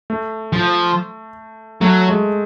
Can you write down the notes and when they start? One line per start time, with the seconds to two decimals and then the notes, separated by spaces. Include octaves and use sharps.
0.10 A3
0.53 F3
1.81 F#3 A3
2.09 G#3